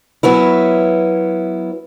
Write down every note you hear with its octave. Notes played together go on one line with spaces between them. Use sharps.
F#3 B3 C#4 E4